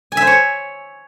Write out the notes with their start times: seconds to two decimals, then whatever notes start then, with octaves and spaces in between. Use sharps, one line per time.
0.12 G#5
0.17 E5
0.22 C5
0.27 C#5